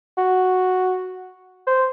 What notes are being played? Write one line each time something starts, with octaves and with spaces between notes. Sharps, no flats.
F#4
C5